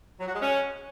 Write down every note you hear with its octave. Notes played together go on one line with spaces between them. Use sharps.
F#3
F#4
G#3
C#4